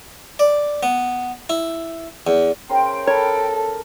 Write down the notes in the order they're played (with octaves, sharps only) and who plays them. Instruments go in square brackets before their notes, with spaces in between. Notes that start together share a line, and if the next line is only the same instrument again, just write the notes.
[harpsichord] D5
B3
E4
E2
[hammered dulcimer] C#3 A#4 C5 [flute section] G5
[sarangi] A4 [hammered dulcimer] A#4 B5 [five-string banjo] C#5